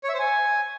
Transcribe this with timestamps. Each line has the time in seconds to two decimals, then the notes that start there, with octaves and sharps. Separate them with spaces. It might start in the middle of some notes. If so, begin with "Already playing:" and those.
0.04 C#5
0.09 E5
0.14 C5
0.19 G#5